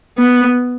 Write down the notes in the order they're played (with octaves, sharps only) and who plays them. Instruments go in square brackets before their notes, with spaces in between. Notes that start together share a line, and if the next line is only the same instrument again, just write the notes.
[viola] B3